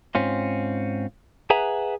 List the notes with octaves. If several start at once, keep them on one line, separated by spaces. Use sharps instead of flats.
G#2 C4 C#4 F4
G#4 B4 E5 F#5 G#5 A#5